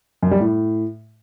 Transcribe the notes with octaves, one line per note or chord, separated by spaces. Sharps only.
F#2
G3
A2